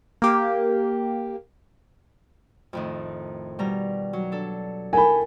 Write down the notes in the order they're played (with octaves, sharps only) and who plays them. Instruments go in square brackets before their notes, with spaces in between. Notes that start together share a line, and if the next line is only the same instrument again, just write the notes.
[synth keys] A#3 G4
[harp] F2 A2 D#3
B2 G3 A#5
F#3
D4 A4
[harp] E4 A4 G5 [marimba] A#4 [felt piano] G#5 B5